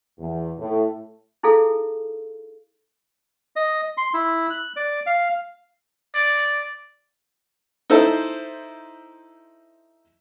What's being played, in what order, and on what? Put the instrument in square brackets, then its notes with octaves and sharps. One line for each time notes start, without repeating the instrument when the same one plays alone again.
[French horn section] E2
A2
[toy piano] D#4 E4 G#4 A4 F5
[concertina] D#5
C6
E4
F#6
D5
F5
[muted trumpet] D5
[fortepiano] D#4 E4 A4 C5